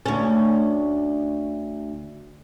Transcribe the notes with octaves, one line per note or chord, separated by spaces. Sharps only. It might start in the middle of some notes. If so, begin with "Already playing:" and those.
D2 C#4